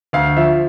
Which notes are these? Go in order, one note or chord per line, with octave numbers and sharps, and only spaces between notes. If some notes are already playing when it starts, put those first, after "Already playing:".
D2 F5
F3 E5